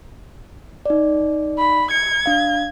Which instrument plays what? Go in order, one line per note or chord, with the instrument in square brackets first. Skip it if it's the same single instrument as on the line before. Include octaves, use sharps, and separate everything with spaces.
[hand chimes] D#4 D5
[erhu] B5
[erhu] G#6 [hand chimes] C#7
[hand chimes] D4 F5